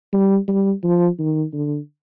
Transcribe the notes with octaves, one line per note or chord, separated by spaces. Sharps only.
G3
G3
F3
D#3
D3